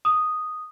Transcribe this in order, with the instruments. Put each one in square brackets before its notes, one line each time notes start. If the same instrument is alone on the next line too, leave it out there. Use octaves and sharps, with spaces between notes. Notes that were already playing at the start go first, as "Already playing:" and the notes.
[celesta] D#6